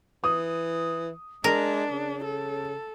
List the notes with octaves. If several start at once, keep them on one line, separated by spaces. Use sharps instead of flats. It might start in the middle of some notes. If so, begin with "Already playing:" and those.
E3 D#6
G#3 D4 A#4
C#3
A4